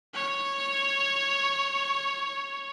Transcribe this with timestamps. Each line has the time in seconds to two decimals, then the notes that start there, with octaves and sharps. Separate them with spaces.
0.14 C#5